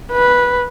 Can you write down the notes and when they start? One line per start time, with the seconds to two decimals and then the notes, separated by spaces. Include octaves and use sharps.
0.12 B4